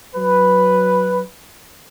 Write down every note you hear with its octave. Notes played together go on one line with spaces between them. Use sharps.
F#3 B4